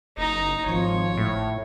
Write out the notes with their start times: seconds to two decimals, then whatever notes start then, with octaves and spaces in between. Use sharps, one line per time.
0.17 F#1 D#4 A#5
0.66 G#1 F3 C#5
1.17 A2